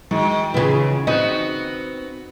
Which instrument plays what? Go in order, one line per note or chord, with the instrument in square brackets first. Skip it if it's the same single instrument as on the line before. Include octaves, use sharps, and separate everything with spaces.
[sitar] D#3 [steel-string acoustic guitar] G#3 E4 F#4
[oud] C#3 B3 [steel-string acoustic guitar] E3 F4 G#4
[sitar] B3 F#4 [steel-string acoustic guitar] C4 [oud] D#4